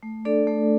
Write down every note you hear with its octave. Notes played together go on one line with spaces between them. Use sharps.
A3
D4 A4 D5
A3